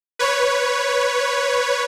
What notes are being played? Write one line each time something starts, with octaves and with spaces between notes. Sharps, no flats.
B4 C#5